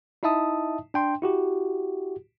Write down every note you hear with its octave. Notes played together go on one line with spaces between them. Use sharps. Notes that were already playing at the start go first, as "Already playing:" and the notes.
D#4 E4 D#5 E5 A5 D#6
D4 G5 C6
E4 F#4 G4